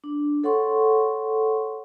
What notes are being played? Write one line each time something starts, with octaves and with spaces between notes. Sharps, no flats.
D4
A4 C#5 F#5 C6 C#6